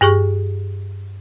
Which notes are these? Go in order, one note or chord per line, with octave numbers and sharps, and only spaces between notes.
G2 G4 G#4 C#6